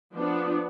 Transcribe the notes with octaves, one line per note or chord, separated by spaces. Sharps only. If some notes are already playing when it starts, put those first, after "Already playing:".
F3 B3 D4